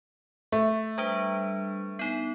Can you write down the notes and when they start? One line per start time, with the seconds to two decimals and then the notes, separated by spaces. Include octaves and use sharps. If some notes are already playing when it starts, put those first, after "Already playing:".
0.52 A3
0.98 G3 D4 B4
1.99 B3 D#4 C7